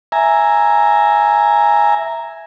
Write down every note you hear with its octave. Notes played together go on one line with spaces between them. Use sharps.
E5 G#5 A#5